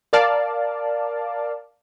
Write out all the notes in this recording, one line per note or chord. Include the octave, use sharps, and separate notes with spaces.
A#4 D5 F5 A5